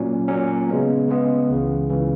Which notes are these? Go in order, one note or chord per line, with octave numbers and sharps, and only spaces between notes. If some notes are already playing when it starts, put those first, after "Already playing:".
Already playing: A#2 F#3 C#4
A#2 F#3 C#4
C#3 G#3 B3
C#3 G#3 B3
C#2 C#3 E3
C#2 C#3 E3